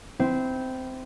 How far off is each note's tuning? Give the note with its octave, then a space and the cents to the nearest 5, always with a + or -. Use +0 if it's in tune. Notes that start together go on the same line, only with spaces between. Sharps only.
C4 -15 E4 -5